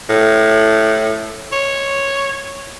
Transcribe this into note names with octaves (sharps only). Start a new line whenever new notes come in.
A2
C#5